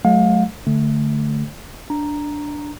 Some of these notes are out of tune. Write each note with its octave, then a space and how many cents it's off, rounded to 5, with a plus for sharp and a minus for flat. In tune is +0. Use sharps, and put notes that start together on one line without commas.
F#3 +0 A3 -30 F5 +35
D3 +0 A3 +0
D4 +0 A#5 +0